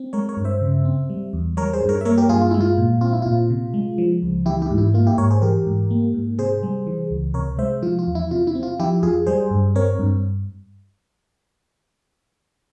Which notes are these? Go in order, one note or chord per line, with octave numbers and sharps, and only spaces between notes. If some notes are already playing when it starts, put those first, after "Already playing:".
Already playing: C4
G#3 A#4 C#5
A#4 C#5
G2
C5 E5
C#3
C4
G3
E2
G3 A#4 C#5
G#4 C5
G2
A#4 C#5
E5
A#3 A#4 C#5
G4 A#4
G2 F4 G#4
F4
G#3 E4
F4
A#2
C4 F4
E4
A#2 F4
C3
G#3
F3
C#2
E3 E4 G4
E4 G4
G#2
E4
A#3 F4
E4 G4
G#2 A#4 C#5
G#4 C5
E3 G4 A#4
G#2
A#3
G#2
C3 G#4 C5
G3
E3
C#2
C3 A#4 C#5
G#3 C5 E5
F3 F4
F4
E2
E4
C3 F4
E4
C4
F4
F3 E4 G4
F2 F4 G#4
G3 G#4 C5
G2
C4 A#4 C#5
G2